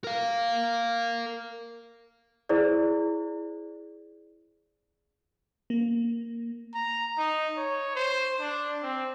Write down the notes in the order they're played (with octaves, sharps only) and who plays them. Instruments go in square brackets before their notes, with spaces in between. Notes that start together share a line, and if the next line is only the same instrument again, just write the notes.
[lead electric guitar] A#4 F5
[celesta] E4 G#4 C5 D5
[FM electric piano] A#3
[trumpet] A#5
D#4
C#5
C5
D4
C4